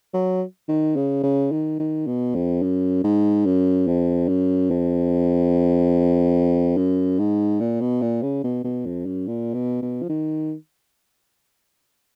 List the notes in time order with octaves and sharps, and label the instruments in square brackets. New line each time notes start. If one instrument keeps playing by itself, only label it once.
[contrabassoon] F#3
D#3
C#3
C#3
D#3
D#3
B2
F2
F#2
G#2
F#2
F2
F#2
F2
F#2
G#2
A#2
B2
A#2
C#3
B2
B2
F2
F#2
A#2
B2
B2
F3
D#3